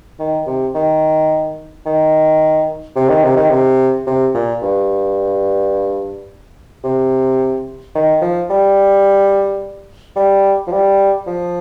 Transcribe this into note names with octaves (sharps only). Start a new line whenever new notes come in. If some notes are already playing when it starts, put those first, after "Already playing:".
D#3
C3
D#3
D#3
C3
D#3
C3
D#3
C3
C3
A#2
G2
C3
D#3
F3
G3
G3
F3
G3
F3